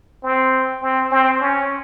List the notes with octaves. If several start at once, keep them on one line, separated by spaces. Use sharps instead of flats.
C4
C4
C4
C#4